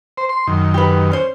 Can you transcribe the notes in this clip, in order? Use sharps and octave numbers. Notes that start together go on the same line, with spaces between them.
C5
C6
F#2 D#3
G4 B4
C#4 C5